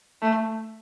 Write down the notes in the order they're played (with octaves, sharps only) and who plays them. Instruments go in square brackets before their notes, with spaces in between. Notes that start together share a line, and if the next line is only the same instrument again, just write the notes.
[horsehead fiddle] A3